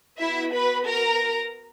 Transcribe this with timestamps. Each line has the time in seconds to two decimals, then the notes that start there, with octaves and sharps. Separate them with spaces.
0.19 B3 E4 F#4 E5
0.53 B4 B5
0.86 A#4 A#5